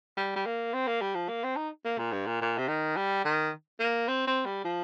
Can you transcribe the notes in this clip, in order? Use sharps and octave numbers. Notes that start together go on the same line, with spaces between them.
G3
G3
A#3
C4
A#3
G3
F3
A#3
C4
D#4
A#3
A#2
G2
A#2
A#2
C3
D#3
G3
D#3
A#3
C4
C4
G3
F3